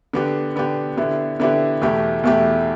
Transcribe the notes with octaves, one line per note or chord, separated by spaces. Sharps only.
D3 B3 G4
D3 B3 G4
D3 B3 E4 G4
D3 B3 E4 G4
E2 B2 A3 E4 G4
E2 B2 A3 E4 G4